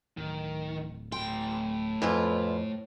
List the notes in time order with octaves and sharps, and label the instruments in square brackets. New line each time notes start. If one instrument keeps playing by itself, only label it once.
[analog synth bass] D1 [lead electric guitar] D#3
[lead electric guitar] A2 C6 [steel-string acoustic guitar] G5
[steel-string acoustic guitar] F2 [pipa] B2 E3 F4